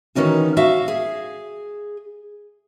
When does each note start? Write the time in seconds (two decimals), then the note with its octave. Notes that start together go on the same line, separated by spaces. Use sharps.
0.15 D#3 E3 C#4 D#4 F#4
0.57 F#4 E5 F5
0.88 G#4